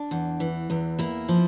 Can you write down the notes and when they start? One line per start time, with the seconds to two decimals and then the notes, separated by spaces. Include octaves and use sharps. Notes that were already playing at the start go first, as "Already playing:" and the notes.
Already playing: D4
0.11 E2
0.40 E3
0.70 E2
0.99 A#3 E4
1.29 F3